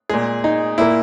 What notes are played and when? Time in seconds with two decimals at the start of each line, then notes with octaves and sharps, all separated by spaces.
0.09 A#2 G#3 G#4
0.44 D#4
0.78 A#2 A#3 E4